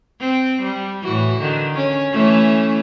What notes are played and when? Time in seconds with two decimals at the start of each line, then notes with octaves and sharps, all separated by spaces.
0.20 C4
0.63 G3
1.04 A2 E3 F#4
1.40 D3 D#3
1.75 C#4
2.12 E3 A3 C#4